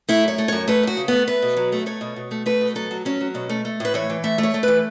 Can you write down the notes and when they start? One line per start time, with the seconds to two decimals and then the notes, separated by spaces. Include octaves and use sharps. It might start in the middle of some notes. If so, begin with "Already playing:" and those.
0.09 A3 E4
0.24 F#2 C#5
0.38 A3
0.48 F#2 C#5
0.68 A3 B4
0.83 F#2 F#4
0.97 C#3
1.08 A3 B3
1.27 A3 B4
1.42 B2
1.57 F#3
1.72 A3
1.86 A3 C#5
2.01 B2
2.16 B2
2.31 A3
2.46 A3 B4
2.61 B2
2.75 F#3 A4
2.91 F#3
3.05 F#3 C#4
3.21 F#3
3.34 B2 C#4
3.49 A3
3.65 A3
3.80 A2 B4
3.94 E3 C#5
4.10 E3
4.24 A3 E5
4.38 A3
4.43 C#5
4.54 A3
4.63 E3 B4